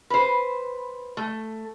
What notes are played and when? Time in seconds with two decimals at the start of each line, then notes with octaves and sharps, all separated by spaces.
0.10 B4 C5
1.17 A3